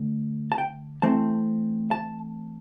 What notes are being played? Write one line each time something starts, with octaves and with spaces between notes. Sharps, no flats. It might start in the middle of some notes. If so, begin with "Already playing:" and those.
Already playing: D3 A3
A5
G5
E3 A3 C4 A5
A5